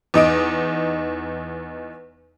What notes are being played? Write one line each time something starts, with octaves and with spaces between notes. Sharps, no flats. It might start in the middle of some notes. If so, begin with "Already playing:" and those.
E2 D#4 D#5 D7